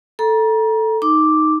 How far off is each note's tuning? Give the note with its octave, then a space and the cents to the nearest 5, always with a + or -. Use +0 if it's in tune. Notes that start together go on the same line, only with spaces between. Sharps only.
A4 +0 A#5 +30
D#4 +0 D6 +0